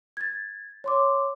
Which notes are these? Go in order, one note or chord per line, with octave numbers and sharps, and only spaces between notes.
G#6 A6
C#5 C6 D6